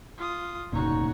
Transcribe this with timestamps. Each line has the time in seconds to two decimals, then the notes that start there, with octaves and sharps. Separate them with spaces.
0.18 F4 D#6
0.72 F1 D2 A#2 C#3 D#4 F#4 C#5